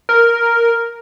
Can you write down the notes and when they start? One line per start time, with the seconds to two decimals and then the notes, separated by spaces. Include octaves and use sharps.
0.09 A#4